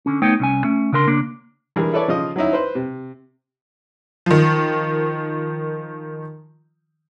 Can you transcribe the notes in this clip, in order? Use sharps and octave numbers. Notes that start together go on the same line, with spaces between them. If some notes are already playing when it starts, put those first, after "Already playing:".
D3 C#4
A3 B3 D#4 C#5 G5
C2 C#4 G#5
A3 C#4
C#3 D4 A#4 C6
C#3 A#3 D4
E3 G3 G#3 D4 G#4 A#4
E4 A4 B4 C#5 D5
C#3 F3 F4 D#5
F#3 C#4 D#4 E4
B4 C5
C3
D#3 F3